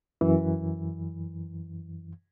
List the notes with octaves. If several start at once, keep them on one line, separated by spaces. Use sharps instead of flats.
F#2 E3